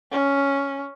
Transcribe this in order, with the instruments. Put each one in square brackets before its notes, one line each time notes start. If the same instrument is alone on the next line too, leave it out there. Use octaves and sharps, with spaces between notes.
[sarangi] C#4